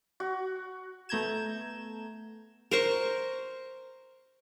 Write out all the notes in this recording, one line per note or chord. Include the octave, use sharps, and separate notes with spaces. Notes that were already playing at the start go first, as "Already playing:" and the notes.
F#4
A3 B3 A#5 G6 G#6 E7
A#4 C5 C#6